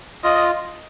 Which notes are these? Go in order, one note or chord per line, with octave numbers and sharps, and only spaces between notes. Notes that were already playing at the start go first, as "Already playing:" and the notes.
F4 D#5